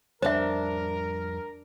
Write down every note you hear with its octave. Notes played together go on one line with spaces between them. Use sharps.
F2 G3 D4 A#4 C5 E5 A5